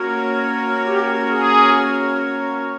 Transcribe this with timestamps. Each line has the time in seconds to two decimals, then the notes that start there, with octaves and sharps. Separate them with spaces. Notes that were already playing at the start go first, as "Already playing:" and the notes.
Already playing: A#3 C#4 F#4 A#4 C#5
0.86 G4
1.30 G#4